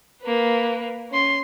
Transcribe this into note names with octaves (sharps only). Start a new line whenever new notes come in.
A#3 B4
C#4 C6